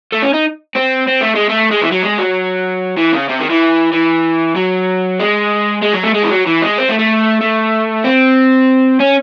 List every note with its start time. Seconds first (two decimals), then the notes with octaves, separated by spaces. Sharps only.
0.12 A3
0.22 C#4
0.33 D#4
0.75 C4
1.07 C4
1.21 A3
1.35 G#3
1.49 A3
1.71 G#3
1.81 E3
1.92 F#3
2.02 G#3
2.18 F#3
2.97 E3
3.13 C#3
3.29 C3
3.40 D#3
3.50 E3
3.93 E3
4.56 F#3
5.20 G#3
5.82 G#3
5.94 F#3
6.04 A3
6.14 G#3
6.23 E3
6.31 F#3
6.47 E3
6.62 G#3
6.78 C4
6.89 A3
6.99 A3
7.41 A3
8.04 C4
9.00 C#4